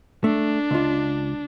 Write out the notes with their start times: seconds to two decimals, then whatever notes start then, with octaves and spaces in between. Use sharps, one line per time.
0.24 A3 D4
0.71 C#2 F4